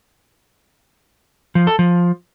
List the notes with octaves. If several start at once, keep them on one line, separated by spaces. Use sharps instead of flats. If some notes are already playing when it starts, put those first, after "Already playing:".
F3
A4
F3